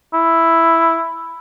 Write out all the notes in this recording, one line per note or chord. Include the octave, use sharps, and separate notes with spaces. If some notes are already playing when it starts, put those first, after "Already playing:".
E4